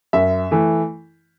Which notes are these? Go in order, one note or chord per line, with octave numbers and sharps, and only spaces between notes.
F#2 E5
E3 A3